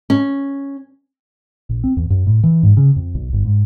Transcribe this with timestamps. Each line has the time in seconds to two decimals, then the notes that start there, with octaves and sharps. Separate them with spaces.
0.10 C#4
1.70 A#1
1.84 C4
1.97 E2
2.10 F#2
2.27 A2
2.43 E3
2.63 G#2
2.77 C#3
2.96 F2
3.15 B1
3.33 G1
3.45 G#2